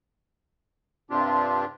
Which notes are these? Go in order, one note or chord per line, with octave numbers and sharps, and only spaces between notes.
G2 C3 C4 D4 F4 G4